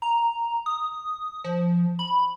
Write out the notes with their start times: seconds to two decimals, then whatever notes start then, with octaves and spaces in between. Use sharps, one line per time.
0.02 A#5
0.66 D#6
1.44 F3
1.99 B5